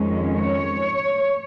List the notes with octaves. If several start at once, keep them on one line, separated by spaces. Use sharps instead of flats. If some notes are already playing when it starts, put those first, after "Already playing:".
Already playing: F2 D#3 G#3 C#4
C#5